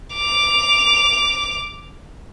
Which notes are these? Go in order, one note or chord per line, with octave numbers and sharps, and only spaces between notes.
D6 F7